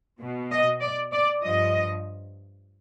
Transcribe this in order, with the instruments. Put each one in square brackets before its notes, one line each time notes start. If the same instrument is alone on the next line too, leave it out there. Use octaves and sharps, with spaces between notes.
[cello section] B2
D#5
D5
D5
G2 F3 D#5